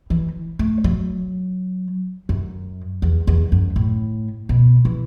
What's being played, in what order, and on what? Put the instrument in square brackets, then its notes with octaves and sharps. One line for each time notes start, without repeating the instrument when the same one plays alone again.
[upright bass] E3
A3
F#3
F#2
E2
E2
F#2
A2
B2
E3